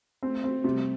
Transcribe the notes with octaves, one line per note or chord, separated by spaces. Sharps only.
A3 C4
C4
C3 G3